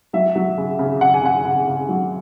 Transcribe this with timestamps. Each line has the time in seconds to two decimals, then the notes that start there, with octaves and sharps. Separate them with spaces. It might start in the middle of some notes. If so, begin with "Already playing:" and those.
0.13 F#3 E5
0.35 F#3
0.58 C#3
0.79 C#3
1.01 C#3 F#5
1.14 G#5
1.23 C#3 F#5
1.45 C#3
1.67 C#3
1.89 F#3